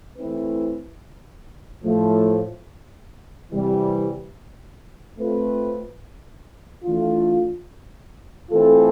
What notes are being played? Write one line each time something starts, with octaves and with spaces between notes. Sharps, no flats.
E3 A3 C4 E4 B4
A2 F3 A3
C3 E3 G3
A3 C4 F4 B4
E3 A3 D4 F4
E3 A3 C4 F4 A4